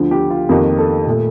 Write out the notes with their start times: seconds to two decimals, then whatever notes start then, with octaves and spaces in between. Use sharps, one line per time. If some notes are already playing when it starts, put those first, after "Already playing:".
Already playing: D2 D3 F3
0.11 G4
0.30 F4
0.49 F2 D#3 A#3 G4
0.78 A4
1.06 A#2 A3